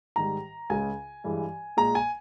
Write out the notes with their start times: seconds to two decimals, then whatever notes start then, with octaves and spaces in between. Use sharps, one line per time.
0.16 G#2 D#3 G3 A#5
0.70 C#2 C#3 G#3 G#5
1.24 G2 E3 G#3
1.77 A#2 G#3 A#5
1.95 G#5